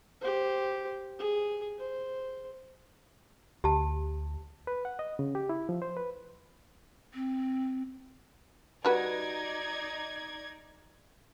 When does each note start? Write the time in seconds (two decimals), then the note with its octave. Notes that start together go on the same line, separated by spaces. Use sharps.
0.21 G4 C5
1.19 G#4
1.79 C5
3.64 D2 G4 A5
4.67 B4
4.85 F#5
4.99 D#5
5.19 C#3
5.35 G4
5.49 E4
5.69 F3
5.82 C5
5.97 B4
7.14 C4
8.85 G3 D#4 F#4 B4 D5 G#6